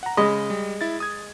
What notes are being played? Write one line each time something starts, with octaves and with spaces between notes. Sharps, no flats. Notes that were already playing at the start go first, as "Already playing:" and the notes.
F#5 A#5
C#3 G#3 D#5 B5
G3
E4 A6
D#6 G#6